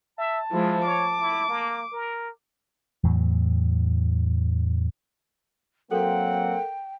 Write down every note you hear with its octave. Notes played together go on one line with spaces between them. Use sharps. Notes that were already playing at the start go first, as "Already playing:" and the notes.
E5 A5
F3 G#3 E4
C#5 D6
E4
A#3
A#4
E2 A2 E3 F#3
F#3 A#3 C4 A4 A#4 F#5 G5